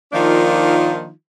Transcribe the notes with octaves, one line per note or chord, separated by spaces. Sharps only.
D#3 F3 A#3 D4 D#4 F4